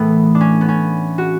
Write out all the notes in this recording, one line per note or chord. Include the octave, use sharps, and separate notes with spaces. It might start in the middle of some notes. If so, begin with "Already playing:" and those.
Already playing: A2 E3 A3 B3
D4
C#4
B3
C#4
F#4